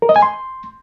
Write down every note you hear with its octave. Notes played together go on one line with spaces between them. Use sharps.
A#4
D#5
G#5
C6